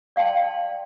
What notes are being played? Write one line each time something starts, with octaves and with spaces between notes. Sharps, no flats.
D5 F5 G5 A5 C6